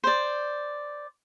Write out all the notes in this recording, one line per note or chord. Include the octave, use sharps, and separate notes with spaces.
C5 D5